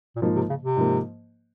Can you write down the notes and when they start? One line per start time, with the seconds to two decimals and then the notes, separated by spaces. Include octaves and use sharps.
0.16 A#2
0.22 G#2 B2 F3 A#3
0.36 C3
0.50 C#3
0.63 C3
0.77 G#2 F3 A#3